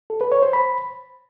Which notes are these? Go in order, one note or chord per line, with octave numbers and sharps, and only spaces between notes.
A4
B4
C#5
C5
B5